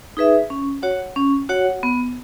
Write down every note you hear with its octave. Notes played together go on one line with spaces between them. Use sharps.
D#4 G#4 B4 E5
C#4
F#4 C#5 F#5
C#4
F#4 C#5 F#5
B3